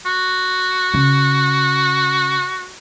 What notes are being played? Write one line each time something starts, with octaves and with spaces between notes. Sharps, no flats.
F#4
C#3